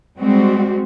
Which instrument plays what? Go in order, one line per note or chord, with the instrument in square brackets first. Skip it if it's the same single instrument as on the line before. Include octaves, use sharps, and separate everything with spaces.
[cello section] G3 G#3 C4 F#4